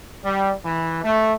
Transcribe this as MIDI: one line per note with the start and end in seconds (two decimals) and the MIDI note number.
0.24 0.54 55
0.65 1.00 52
1.04 1.34 57